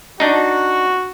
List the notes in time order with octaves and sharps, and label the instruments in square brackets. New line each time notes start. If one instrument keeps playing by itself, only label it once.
[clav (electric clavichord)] D4 D#4 [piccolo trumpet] F#4